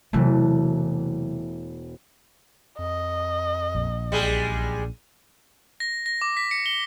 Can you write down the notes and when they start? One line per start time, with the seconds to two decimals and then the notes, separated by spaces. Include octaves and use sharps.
0.13 E1 C3 E3 F#3 A3
2.79 F2 D#5
3.75 A#1
4.12 B1 G3 G#3 G#4
5.80 A#6
6.06 A#6
6.22 D6
6.37 B6
6.51 C#7
6.66 G7